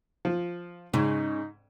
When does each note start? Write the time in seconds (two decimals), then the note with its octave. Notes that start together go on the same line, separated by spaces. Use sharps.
0.25 F3
0.94 G#2 C#3 D#4